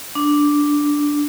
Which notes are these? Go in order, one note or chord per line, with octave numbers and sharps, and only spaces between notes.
D4